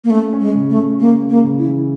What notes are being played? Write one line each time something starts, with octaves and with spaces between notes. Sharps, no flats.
A#3
A3 C#4
C#4
G#3
C#3
A3
C#3
G#3 A#3
C#4
A#3
C#3
E4
E3